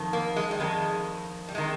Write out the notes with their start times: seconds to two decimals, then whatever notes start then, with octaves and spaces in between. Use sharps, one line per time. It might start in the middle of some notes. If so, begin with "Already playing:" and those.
Already playing: F2 D#3
0.13 A#3
0.36 G#3
0.51 G3
0.60 F2 D#3 G#3
1.49 G3
1.55 C3 D#3 G#3